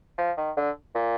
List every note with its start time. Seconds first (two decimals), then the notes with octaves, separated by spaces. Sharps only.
0.18 F3
0.37 D#3
0.57 D3
0.95 A#2